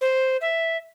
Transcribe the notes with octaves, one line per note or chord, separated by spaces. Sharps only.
C5
E5